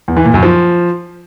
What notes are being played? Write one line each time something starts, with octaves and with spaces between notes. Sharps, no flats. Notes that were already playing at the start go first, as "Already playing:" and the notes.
E2
E3
A#2
F#2
F3